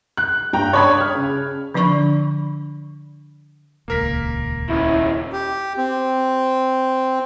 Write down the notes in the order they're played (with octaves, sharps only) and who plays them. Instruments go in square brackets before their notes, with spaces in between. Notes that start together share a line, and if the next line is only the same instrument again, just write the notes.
[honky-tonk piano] F#6
G2 G5 A#5
C#5 D5 A5 B5 D#6 G#6
F6
C#3
[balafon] D3 F3 D4 D5 B5 C#6
[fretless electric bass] D#1 C#2 [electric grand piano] A#3 A#4 B6
[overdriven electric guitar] D#2 C#4 [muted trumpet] E4
[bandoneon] G4
C4